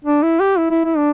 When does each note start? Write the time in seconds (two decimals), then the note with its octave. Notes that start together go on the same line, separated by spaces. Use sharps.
0.04 D4
0.23 E4
0.40 G4
0.58 E4
0.71 E4
0.85 E4
0.97 D4